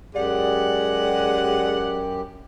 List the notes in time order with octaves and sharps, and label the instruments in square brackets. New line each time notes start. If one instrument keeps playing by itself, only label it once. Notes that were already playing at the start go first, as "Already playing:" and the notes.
[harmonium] F#2 G4 [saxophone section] G#3 F#5 [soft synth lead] D5